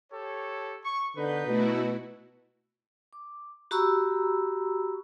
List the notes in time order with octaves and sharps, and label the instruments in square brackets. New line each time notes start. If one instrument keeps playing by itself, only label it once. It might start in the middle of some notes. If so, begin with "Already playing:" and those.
[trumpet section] G4 A4 C#5
C#6
[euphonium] D3 [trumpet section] B3 D#4 B4 [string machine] G6
[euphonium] B2 [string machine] A3 E4 F#4
[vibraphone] D6
F#4 G4 A#5 B5 C#6 E6